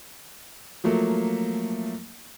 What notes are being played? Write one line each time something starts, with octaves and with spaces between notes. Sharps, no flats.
F3 F#3 A3 A#3